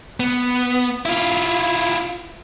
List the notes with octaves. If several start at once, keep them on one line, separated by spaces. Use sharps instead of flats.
B3
E4 F4